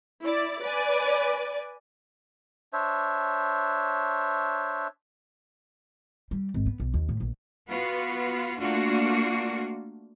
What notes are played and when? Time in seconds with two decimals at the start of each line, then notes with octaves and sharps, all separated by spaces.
0.23 E4 D5
0.62 B4 D5 G#5
2.73 D4 C5 C#5 E5
6.31 G3
6.54 G#1
6.66 B3
6.80 B1
6.94 D#2
7.09 A2
7.20 A#1
7.67 B3 F4 F#4 B4
8.58 A3 A#3 D4 F4 F#4